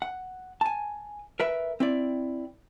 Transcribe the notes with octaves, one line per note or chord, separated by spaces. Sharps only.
F#5
G#5 A5
A#4 B4 E5
C4 E4 D5